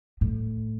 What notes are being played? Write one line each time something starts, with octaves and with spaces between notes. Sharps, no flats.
A2